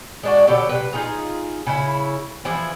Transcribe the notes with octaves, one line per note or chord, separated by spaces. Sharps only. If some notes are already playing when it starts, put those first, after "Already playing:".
G#3 D4 F#4
B2 D3 F#3 G4
C3 B4
D#4 F4 G#4 A#5
C#3 E4
E3 F3 E4 G#4